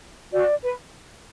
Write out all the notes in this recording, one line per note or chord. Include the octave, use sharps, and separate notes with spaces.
F#4 D5
B4